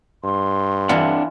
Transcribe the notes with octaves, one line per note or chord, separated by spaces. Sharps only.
G2 C6
E3 C4 D4 F4 F#5